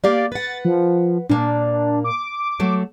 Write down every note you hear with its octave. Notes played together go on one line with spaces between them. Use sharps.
A#3 G4 D5 F5
B4 F#5 A6
F3
A#2 A#3 D4
D6
F#3 A3